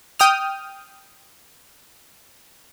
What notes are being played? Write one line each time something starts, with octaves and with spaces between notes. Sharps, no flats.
G5 D#6 F6